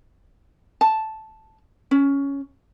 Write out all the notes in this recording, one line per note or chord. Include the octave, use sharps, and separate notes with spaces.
A5
C#4